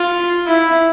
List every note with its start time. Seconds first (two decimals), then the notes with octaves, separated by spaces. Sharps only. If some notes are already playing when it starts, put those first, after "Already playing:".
Already playing: F4
0.47 E4